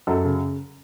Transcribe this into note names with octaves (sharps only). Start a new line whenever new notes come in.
F#2 A4
C#3